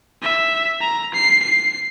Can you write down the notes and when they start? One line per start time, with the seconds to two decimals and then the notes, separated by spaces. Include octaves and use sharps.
0.22 E5
0.81 A#5
1.14 C7
1.43 C7